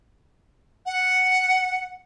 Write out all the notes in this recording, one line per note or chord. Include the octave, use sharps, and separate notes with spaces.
F#5